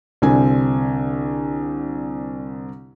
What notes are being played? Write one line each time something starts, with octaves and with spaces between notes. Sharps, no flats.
C2 D3 C4 D4 G#5